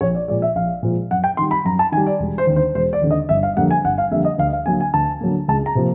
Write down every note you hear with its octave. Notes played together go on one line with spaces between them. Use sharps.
A#1 C#5
D5
A#2 F3 G#3 D5
E5
A#1 F5
A#2 F3 G#3
F#2 F#5
G5
D#3 G3 C6
B5
F#2 A#5
A5
D#3 G3 G#5
D5
E1
C5
D#2 D3
C5
E1 C5
D5
D#2 D3
D#5
G1 E5
F5
F2 D3 G3 A#3 F#5
G#5
G1 F#5
F5
F2 D3 G3 A#3 E5
D#5
D2 F5
F5
D3 F#3 A#3 G#5
G#5
D2 A5
D3 F#3 A#3
C#2 A5
A#5
C3 F3 A#3